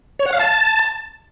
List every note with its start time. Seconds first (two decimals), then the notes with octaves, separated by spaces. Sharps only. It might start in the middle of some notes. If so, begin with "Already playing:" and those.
0.19 C#5
0.26 F#5
0.33 F5
0.40 A5